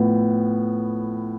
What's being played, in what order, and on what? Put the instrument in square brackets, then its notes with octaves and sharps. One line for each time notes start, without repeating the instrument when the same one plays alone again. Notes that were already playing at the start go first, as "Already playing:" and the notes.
Already playing: [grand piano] A2 F3 B3